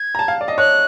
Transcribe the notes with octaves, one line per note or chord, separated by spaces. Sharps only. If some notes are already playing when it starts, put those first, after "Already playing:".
Already playing: G#6
A#5
A5
F5
D5
D#5
C#5 F#6